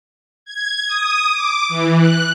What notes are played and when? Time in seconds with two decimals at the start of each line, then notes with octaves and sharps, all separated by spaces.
0.45 G#6
0.87 D#6
1.31 D6
1.69 E3
1.97 F#6